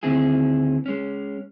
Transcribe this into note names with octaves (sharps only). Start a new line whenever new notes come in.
D2 D#3 C4 E4 G#4
G#3 C#4